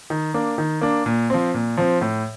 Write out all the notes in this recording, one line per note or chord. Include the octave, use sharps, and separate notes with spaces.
D#3
A#3 D4
D#3
A#3 D4
A#2
F3 C4
A#2
F3 C4
A2